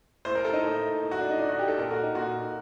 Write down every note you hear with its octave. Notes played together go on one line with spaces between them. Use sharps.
A2 C5
A#4
A4
D#4
A2
A2
F#4
D4
D#4
A2 D4
F#4
G4
A4
A#2 A#4
F#4
D#4
A#2 F#4